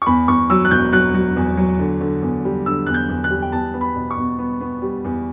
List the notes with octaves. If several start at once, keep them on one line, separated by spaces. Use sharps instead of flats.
C#6
E2 B5
E2 C#6
F#3 E6
F#6
E1 G6
F#3 F#6
F#3
E2
F#3
D3
D3
E2
G3
D3 E6
E2 F#6
G6
E2
F#6
G3
G5
E2 A5
B3
B5
B2
C#6
B2
B3
B3
G3
E2